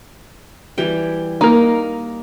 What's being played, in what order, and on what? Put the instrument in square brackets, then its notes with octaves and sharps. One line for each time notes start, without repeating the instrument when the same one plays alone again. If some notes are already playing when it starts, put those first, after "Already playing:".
[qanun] E3 G3 G5
[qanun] A#3 [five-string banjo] D#4 A#4